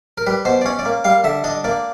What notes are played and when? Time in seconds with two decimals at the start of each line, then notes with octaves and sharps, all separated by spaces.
0.18 A#4
0.27 G3 B4
0.45 B2 C5
0.61 D5
0.66 C#4 C#5
0.79 D5
0.85 A#3
1.04 G3 F5
1.24 D3 E5
1.44 D4 D#5
1.64 A#3 D5